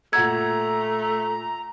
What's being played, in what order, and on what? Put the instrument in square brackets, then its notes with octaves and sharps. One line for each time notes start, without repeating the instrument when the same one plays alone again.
[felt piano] A#2 F#5 E6 [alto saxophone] A3 [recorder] A#5 [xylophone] G#6